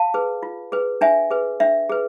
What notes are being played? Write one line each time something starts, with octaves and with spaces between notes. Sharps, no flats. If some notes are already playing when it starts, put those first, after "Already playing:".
Already playing: F5 A5
G#4 B4
F4
G#4 B4
D4 E5 G#5
G#4 B4
D4 E5
G#4 B4